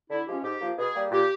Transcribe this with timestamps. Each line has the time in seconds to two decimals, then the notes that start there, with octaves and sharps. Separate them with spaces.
0.10 D3 E4
0.27 F3 G#3 C#4 G4
0.43 G#2 G4
0.61 F3 A#3
0.78 B2 G#4
0.96 G3 A#3
1.11 A#2 G4